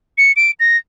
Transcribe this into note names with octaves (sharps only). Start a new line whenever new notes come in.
C#7
D7
A#6